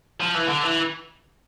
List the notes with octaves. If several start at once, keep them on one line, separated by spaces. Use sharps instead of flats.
F3
E3
D3
E3